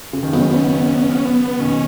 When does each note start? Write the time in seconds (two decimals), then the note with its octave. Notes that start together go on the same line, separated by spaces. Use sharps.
0.13 C#3
0.23 D#3
0.33 C#3 F#3 B3
0.41 C#4
0.48 B3
0.56 C#4
0.64 B3
0.72 C#4
0.78 B3
0.86 C#4
0.94 B3
1.02 C#4
1.09 B3
1.17 C#4
1.25 B3
1.59 B2 D#3 C#4